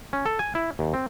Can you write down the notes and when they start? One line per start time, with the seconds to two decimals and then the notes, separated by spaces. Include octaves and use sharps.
0.13 C#4
0.26 A4
0.39 G#5
0.55 E4
0.79 D#2
0.94 C4